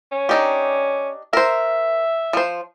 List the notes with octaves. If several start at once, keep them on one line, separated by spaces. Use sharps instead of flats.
C#4
D4 D#4 G4
A#4 C5 E5
F3 C5